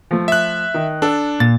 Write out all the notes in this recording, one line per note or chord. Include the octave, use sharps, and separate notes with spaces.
F3 A3
E5 F#6
D#3
D4 A4
A#2 A6